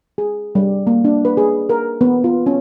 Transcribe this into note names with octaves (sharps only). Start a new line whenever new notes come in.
G#4
G3
A#3
D4
B4
G#4
A#4
B3
F4
C#4